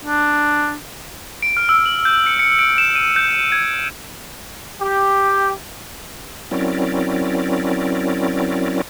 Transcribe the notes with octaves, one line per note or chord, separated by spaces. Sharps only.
D4
D7
F6
E6
F#7
G6
C#7
C#7
D7
E7
D#7
G6
G#6
G4
F#3 C4 C#4 E4 A#4 D5